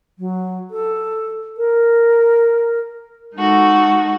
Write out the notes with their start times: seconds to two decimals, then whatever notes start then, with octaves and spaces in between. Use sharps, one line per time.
0.18 F#3
0.70 A4
1.57 A#4
3.35 G#3 D#4 F#4 A4